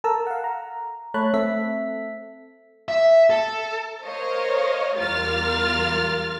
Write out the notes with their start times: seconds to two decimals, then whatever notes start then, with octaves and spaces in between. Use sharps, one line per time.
0.04 A4 A#4 A5 A#5 E6
0.27 F5 F#5
0.44 A#5
1.14 A3 C#5 A5 B5 F#6
1.33 A3 C4 A4 E5 B6
2.89 E5
3.30 A4
4.02 A#4 C5 C#5 D#5 F5
4.98 E2 G3 F4 A#4 F6 A6